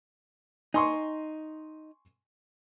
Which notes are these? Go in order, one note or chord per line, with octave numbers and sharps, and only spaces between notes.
D#4 G#5 C6 C#6